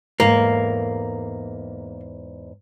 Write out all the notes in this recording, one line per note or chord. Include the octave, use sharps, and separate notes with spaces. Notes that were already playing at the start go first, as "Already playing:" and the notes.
E2 G#2 A3 A#3